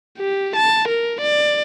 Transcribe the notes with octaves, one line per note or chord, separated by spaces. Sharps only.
G4
A5
A#4
D5